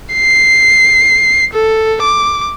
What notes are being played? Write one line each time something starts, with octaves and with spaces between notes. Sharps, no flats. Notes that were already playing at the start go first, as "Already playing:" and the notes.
C7
A4
D6